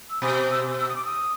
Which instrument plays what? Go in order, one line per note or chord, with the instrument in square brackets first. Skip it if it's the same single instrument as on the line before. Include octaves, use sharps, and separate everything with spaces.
[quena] E6
[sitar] B2 [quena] D#6
[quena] E6
E6
D#6
D6
D#6